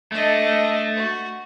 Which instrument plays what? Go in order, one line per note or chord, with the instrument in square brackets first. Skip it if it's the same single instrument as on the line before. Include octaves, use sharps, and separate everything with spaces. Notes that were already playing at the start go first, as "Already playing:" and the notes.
[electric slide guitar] A3 [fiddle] D4 D#5
[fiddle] F#4